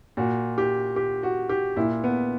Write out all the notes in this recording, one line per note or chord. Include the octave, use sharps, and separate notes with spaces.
A#2 F#4
G4
G4
F#4
G4
A#2 E4
B3